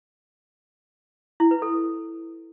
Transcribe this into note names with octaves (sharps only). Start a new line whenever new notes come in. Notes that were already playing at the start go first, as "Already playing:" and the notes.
E4
B4
A4